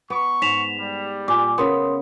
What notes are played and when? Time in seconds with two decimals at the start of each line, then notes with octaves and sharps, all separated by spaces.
0.10 B3 C#6
0.42 G#2 B6 E7 F7
0.79 G3
1.28 A#2 G#5 D6
1.58 C#3 B3 A#4 C6 D#6